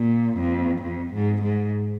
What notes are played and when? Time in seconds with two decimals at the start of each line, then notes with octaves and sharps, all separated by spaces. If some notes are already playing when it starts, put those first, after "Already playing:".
Already playing: A#2
0.38 F2
0.83 F2
1.13 G#2
1.42 G#2